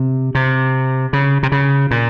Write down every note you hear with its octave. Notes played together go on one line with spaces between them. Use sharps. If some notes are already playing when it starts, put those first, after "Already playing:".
Already playing: C3
C3
C#3
C3
C#3
A#2